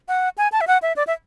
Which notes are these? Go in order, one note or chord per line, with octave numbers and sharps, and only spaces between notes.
F#5
G#5
A5
E5
F#5
E5
D5
E5